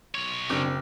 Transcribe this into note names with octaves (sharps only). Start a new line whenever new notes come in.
B1 C#5
F#1 C4 D4 D6